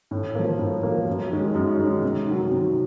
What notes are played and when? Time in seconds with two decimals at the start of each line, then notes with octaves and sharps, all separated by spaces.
0.11 A2
0.35 F3 A#3
0.59 A2
0.83 F3 A#3
1.07 F#2
1.31 D#3 G#3 C#4
1.55 F#2
1.80 D#3 G#3 C#4
2.03 C3
2.27 D#3 F#3
2.51 C3